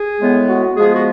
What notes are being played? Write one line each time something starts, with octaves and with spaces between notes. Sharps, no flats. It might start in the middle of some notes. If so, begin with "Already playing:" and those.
Already playing: G#4
A2 G#3 B3
F#4
F3 G#3 B3 G#4
F#4